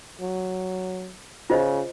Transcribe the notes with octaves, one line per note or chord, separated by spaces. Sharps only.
F#3
C#3 F4 C5 D#5